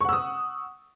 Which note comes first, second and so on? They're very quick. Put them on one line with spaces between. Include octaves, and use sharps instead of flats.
C#6 F#5 E6 D#6